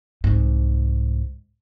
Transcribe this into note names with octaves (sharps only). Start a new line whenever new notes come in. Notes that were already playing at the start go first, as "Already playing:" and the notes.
C2 G#2